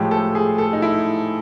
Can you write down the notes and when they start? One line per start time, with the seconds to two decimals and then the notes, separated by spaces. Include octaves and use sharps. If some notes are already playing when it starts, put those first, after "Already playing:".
Already playing: A2 F3 G#3 G4
0.11 A4
0.35 G#4
0.58 A4
0.73 D#4
0.82 E4